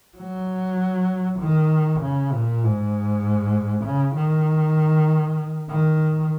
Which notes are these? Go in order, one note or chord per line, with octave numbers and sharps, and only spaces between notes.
F#3
D#3
C#3
A#2
G#2
C#3
D#3
D#3